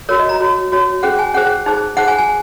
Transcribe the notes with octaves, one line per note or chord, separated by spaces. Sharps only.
F#4 A#4 C#5
D#5
A#5
F#4 C#5
F#4 C#5
C#4 G#4 C5 F#5
G#5
C#4 G#4 C5 F#5
D#4 G#4 C5
D#4 G#4 C5 F#5
G#5
G#5